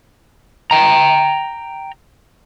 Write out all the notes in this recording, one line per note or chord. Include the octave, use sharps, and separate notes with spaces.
G5 A#5